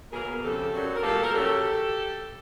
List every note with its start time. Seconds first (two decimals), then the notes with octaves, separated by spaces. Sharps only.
0.12 B2 F#3 A#3 G#4 A#4
0.43 F2 C#3 F3 G4 A4
0.72 F#2 D3 F#3
0.96 A#4
1.02 A#2 G3 A#3 G4 A4
1.23 A#4
1.32 C#3 F#3 G4 A4